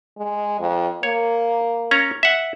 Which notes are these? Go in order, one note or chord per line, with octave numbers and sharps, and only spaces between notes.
G#3
F2
A#3 C#5
C#4 C#5 A#5
E5 F#5